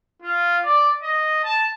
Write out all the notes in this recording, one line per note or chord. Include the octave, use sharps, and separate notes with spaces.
F4
D5
D#5
A5